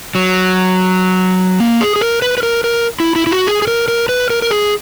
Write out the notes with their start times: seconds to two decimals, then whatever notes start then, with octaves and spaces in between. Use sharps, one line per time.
0.15 F#3
1.60 A#3
1.81 G#4
1.96 G#4
2.01 A#4
2.22 B4
2.38 B4
2.43 A#4
2.64 A#4
3.00 E4
3.16 E4
3.27 E4
3.31 F#4
3.47 G#4
3.62 G#4
3.68 A#4
3.88 A#4
4.09 B4
4.30 A#4
4.42 A#4
4.51 G#4